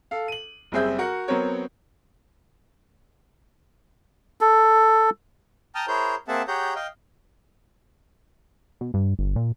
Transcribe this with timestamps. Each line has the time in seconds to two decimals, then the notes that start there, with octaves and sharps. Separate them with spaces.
0.11 A4 F5
0.28 D#7 F#7
0.72 F#1 G3 C4 G#4 E5 G6
0.98 F#4 A#4 F#5
1.28 F#3 B3 C4 A#4 C#5
4.41 A4
5.75 G5 A5 A#5 D#6 F6
5.88 E4 G#4 A#4 C5 C#5 G6
6.28 A#3 C4 G#4 E5 F#5 A5
6.48 G4 G#4 C#5 F#5 A#5 G6
6.75 D#5 F5 G5
8.81 B2
8.94 G2
9.19 G1
9.36 A#2